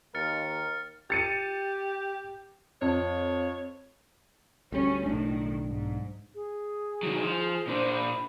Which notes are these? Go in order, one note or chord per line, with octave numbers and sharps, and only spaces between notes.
D#2 A#4 F6 A6 C#7
G4 A6 C#7 D#7
F2 C#5
D2 G3 C#4
B1 A2 D#3 D4
G#2
G#4
D#3 F#3
F3
A#2 D4 C5
B5